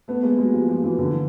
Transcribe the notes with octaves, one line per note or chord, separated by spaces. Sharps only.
A3 B3
G#3 A#3
F#3 G#3
F3 G3
F3 G3
E3 F#3
D3 E3